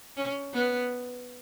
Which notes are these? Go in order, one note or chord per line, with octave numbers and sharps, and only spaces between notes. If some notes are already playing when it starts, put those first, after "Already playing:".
C#4
B3